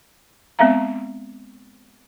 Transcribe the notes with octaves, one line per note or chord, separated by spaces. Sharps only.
G#3 B3 C4 E5 F5 A#5